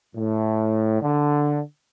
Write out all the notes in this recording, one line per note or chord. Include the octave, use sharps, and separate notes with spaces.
A2
D3